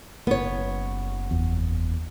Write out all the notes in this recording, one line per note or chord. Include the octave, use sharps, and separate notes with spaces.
F#1 B3 C#5
E2